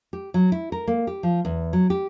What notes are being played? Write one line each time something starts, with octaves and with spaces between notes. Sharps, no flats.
G4
F#3
E4
A#4
A#3
G4
F3
E2
F#3
G4